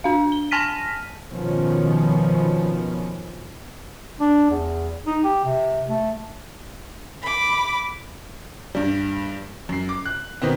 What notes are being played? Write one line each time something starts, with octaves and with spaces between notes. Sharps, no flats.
D4 F5
G7
G#5 A5 F6 A#6 B6 D#7
B2 D#3 F3 B3 C#4
D4
E2
D#4
G4
C3
A3
B5 D6
G2 G3
F#2 C7
D6
F#6
B2 D#3 B3 C4